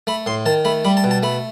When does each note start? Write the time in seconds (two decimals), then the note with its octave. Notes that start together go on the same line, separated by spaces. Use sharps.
0.07 A3 B5
0.26 A2 C6
0.46 D#3 A5
0.65 A3 B5
0.85 G3 B5
0.97 A5
1.04 B2
1.11 A5
1.23 A3 B5